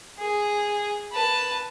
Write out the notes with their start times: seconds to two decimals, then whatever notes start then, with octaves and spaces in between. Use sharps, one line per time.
0.18 G#4
1.12 B4 A5